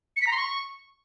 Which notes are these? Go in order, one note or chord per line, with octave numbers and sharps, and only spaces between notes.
C#7
B6
A#5
C6
C#6